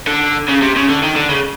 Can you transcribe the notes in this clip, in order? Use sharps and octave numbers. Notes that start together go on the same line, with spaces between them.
D3
C#3
C3
C#3
D3
D#3
D3
C#3